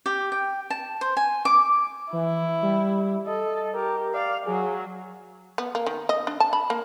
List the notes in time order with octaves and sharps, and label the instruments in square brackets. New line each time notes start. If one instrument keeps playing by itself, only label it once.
[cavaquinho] G4
G5
A5
C5
G#5
D6
[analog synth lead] E3 [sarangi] E4
[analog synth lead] G3
[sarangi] A4 [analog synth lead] D#5
[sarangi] G4 [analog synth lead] A#4
[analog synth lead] D5 [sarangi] F5
[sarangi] F#3 [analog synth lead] G#4
[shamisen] B3
A#3
D#3
D#5
D4
A5
B5
A#3